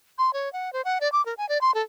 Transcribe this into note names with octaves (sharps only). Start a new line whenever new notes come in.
C6
C#5
F#5
C5
F#5
D5
D6
A#4
G#5
D5
C6
A4